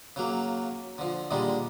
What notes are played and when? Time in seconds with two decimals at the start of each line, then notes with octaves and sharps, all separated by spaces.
0.16 C#3 F#3 A#3
0.98 D3 F3
1.31 A#2 D3 D#3 G3 G#3